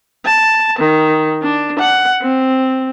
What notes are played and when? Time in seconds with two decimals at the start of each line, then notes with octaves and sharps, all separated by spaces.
0.25 A5
0.79 D#3
1.42 D4
1.80 F#5
2.22 C4